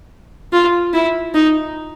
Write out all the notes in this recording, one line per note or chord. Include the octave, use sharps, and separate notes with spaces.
F4
E4
D#4